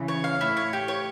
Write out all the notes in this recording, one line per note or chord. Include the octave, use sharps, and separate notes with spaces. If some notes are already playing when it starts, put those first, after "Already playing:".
Already playing: C#3 E3
C#5
F5
A2 E4
C#5
G4
C#5